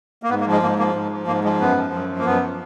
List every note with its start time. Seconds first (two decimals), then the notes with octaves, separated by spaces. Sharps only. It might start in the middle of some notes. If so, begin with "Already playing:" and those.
0.23 A#3
0.30 G#2 B3
0.41 A#3
0.47 F3
0.52 G#3
0.62 G#2 A#3
0.79 F3 A#3
0.95 G#2
1.12 F3
1.27 G#2 A#3
1.44 F3 G#3
1.60 F#2 B3
1.77 F3
1.93 F#2
2.09 F3
2.19 A#3
2.25 F#2 B3
2.42 F3